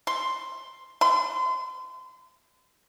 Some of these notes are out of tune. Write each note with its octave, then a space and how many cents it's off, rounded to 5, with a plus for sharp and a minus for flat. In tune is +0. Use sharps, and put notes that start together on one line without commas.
C6 +5
C6 -35